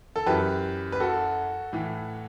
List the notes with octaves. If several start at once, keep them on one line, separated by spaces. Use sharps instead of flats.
A4
F#2 E3 G4 B4
B4
F#4 A4
A2 E3